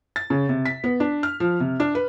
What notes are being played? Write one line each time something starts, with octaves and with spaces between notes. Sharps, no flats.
A6
C#3
C3
B6
B3
D4
F6
F3
C3
D4
B4